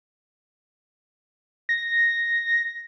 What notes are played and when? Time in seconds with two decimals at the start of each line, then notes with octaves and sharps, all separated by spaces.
1.69 A#6